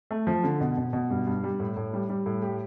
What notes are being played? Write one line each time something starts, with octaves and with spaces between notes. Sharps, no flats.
A3
F3
D3
B2
B2
B2
G2
G2
G3
A2
A2
G3
G3
A2
G4